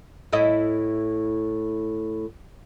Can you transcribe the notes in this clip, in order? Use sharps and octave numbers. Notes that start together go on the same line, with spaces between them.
A2 E4 D#5